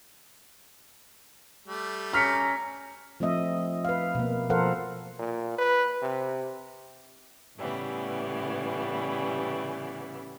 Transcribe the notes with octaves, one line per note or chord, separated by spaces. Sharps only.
G3 A3
C#4 A#5 F6 B6 C#7
F3 A3 C4 D#5 E5
B4 F5
B2 A#3
F3 A4 A#4 C5 F5 F#5
A#2
B4
C3
A2 C#3 E3 G3 B3